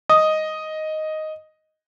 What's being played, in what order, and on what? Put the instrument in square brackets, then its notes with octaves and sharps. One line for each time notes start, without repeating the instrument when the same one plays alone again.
[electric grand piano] D#5 [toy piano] D#6